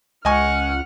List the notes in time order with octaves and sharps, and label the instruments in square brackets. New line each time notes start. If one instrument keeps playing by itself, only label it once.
[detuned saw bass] C#2 [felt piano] D#5 G#5 C#6 [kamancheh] F#5 F6